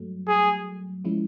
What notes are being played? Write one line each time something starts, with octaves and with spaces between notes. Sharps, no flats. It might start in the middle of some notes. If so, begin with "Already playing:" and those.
Already playing: G2 F#3 A3
G#4
F3 G#3 C#4 E4